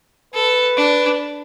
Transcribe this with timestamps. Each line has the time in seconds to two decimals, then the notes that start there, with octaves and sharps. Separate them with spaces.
0.34 A4 B4
0.77 D4